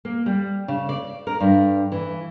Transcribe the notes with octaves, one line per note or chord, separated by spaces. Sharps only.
A#3
G3
C#3
D5
A#4
G2
E3